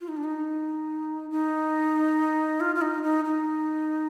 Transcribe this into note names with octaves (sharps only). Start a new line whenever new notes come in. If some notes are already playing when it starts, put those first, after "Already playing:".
F4
D#4
D4
D#4
D#4
F4
F4
D#4
D#4
D#4